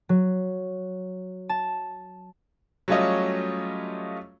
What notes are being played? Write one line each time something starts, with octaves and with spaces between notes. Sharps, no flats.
F#3
A5
F#3 G3 A3 C#4 F4 D#5